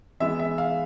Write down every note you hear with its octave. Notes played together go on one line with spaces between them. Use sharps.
E3 G#3 B3 E5
E5
F5